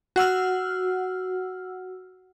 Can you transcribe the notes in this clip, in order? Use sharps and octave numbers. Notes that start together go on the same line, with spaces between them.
F#4 F#5 E6 F6